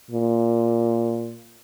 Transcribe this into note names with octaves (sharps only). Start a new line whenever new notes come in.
A#2